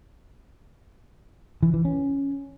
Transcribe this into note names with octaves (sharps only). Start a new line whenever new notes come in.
E3
E3
C#4